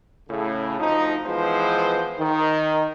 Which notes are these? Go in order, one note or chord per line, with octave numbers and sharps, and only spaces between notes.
A2 C#3
D2 F3 D#4
E3 F3 G#3 B3 C5
D#3